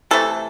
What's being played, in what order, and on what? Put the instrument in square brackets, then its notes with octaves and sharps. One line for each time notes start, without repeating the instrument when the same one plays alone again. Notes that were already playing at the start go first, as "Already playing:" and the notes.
[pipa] C3 E3 A3 A4